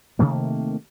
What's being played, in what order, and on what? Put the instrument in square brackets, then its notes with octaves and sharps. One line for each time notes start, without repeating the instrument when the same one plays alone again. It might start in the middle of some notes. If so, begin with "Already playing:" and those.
[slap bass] C3 D#3 A3 A#3